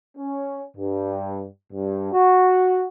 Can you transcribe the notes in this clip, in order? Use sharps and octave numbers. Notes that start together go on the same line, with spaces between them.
C#4
G2
G2
F#4